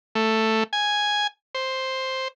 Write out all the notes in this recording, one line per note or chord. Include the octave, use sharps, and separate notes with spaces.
A3
G#5
C5